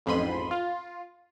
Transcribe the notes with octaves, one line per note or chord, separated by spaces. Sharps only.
A1 F2 G#2 B5 C6 D#7
F4